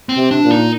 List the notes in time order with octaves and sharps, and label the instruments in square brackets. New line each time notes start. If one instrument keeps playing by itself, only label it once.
[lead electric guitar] C4
[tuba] C3
[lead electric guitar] D4
[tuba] A#2
[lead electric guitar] D#4